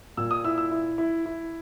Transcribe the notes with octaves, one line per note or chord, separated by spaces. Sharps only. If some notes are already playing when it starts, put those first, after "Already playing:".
A#2 E6
D#6
E4 E6
E6
E4
E4
E4